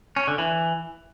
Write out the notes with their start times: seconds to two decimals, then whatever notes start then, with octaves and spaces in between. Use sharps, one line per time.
0.16 C#4
0.27 D3
0.38 E3